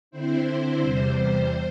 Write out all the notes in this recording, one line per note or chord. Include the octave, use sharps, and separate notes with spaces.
D3 C4 E4 C5
C5
E2 C3 G3
C5